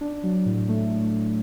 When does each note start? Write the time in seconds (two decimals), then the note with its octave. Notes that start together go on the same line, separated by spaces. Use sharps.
0.01 D4
0.23 F#3
0.46 A2
0.69 A3